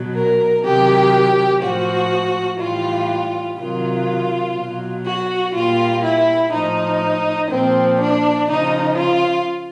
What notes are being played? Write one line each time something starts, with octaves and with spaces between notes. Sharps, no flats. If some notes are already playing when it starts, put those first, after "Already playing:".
Already playing: B2 F#3
A#4
C3 D#3 F#3 G4
A2 F3 F#4
A2 E3 G3 F4
C3 D#3 F#3 F4
B2 F#3
F#4
A#2 G3 F4
E4
A2 F3 D#4
A#2 F3 C4
D4
C#3 F3 D#4
F4